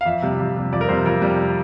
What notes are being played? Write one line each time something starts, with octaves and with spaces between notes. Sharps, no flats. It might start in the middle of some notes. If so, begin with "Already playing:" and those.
F5
F2 E5
C3 G3
F2
C3 G3
F2 D5
A#4
C3 G3 C5
F2 A#4
C3 G3